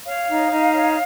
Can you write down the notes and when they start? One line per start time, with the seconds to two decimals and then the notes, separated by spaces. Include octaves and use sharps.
0.04 C#5 F5
0.28 D#4
0.51 D#4
0.74 C#5